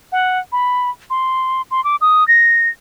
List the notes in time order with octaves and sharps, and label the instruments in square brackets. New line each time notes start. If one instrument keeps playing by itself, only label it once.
[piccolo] F#5
B5
C6
C6
D6
D#6
A#6